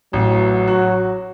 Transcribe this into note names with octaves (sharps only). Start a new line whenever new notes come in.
A1 F#3
F#4